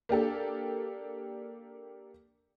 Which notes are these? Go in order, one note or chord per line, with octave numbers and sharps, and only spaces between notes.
A#3 D4 G4 A4